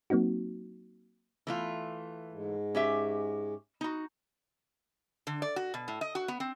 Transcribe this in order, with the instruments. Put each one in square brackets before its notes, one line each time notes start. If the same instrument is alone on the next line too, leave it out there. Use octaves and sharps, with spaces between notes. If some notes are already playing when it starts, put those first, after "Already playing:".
[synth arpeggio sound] F#3 A#3 C4 D#4 F#4
[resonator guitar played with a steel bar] E3 A3 F4
[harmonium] G#2 G#3
[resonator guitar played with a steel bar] C#4 G4 E5
D#4 F#4
D3
D5
F#4
B2
A2
D#5
F#4
B3
C4